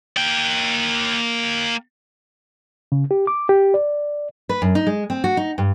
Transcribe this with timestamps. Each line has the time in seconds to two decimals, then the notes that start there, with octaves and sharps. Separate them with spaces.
0.17 A#3 G5
2.92 C#3
3.11 G4
3.27 D6
3.49 G4
3.74 D5
4.49 B4
4.62 F#2
4.75 D#4
4.87 G#3
5.10 C4
5.24 F#4
5.37 D#4
5.58 G2